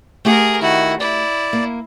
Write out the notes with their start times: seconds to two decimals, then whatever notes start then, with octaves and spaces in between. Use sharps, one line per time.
0.25 A3 G4 G#4 A#4 F#5
0.62 D#3 E4 F#4
1.00 E4 D5
1.53 A#3